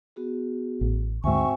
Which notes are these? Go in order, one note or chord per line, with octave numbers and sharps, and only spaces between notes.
B3 F#4 G#4
A1
D2 G#2 C4 F#4 E5 G#5 C#6